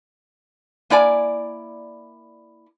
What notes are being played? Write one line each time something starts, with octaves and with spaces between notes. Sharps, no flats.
A#3 E4 D5 G#5